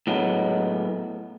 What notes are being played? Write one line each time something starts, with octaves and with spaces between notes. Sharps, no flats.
A2 F#3 G#3 B3